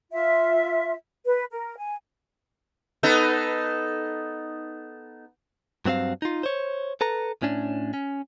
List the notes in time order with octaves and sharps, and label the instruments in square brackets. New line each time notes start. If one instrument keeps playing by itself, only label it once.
[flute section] F4 E5
B4
A#4
G#5
[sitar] B3 D#4 A4
[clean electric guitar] G2 F#3 C4 G#4 F5
D#4 F4
C5 C#5
A4 B4 A#5
A2 C#4 D4
C#4